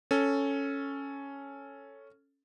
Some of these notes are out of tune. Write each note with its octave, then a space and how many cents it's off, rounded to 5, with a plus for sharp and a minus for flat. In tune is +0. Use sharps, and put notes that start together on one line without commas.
C#4 +0 A4 +0